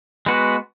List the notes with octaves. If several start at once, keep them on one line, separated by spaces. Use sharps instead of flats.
G#3 B3 F#4 B4